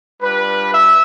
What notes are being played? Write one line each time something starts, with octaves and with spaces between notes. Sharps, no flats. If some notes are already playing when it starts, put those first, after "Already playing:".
G3 D4 F4 B4
E5